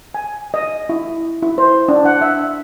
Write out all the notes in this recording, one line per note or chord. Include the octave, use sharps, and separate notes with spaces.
G#5
D#5
E4
E4
C5
D4
F#5
E5